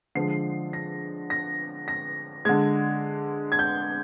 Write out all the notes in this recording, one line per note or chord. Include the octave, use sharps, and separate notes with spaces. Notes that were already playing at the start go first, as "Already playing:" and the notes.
D3 F3 G#3 C7
A#6
A#6
A#6
D3 G#3 G#6
G#6
G6